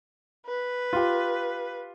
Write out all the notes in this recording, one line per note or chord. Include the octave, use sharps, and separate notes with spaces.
B4
F4 G4